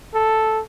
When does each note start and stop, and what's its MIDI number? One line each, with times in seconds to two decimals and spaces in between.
0.14 0.60 69